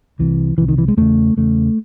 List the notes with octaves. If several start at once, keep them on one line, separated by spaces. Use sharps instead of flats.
C2 C3 E3
C2 C3 E3
D#3
E3
G#3
E2 C#3 A3
E2 C#3 A3